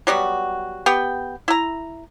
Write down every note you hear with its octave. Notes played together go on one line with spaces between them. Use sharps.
F#3 G3 B3 F#4
B3 G4 G5
E4 A#5